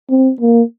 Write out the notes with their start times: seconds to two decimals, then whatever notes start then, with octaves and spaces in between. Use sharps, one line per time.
0.10 C4
0.41 A#3